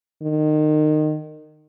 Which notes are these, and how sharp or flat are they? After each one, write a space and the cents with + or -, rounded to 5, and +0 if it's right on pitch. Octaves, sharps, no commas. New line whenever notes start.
D#3 -25